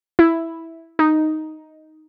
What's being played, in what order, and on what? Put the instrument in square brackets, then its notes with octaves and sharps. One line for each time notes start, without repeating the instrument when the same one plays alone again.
[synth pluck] E4
D#4